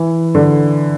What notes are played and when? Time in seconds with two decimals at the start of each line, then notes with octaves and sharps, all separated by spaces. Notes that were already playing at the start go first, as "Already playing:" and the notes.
Already playing: E3
0.35 D3